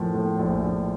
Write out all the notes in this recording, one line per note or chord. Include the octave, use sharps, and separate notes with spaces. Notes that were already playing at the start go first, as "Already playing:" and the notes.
Already playing: A2 F3 A#3
A2
A#1
A#1